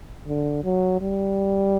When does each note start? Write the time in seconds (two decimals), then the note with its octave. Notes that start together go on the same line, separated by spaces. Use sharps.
0.27 D3
0.64 F#3
1.01 G3